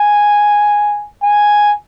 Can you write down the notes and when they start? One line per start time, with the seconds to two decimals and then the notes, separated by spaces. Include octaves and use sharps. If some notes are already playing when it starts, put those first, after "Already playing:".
Already playing: G#5
1.23 G#5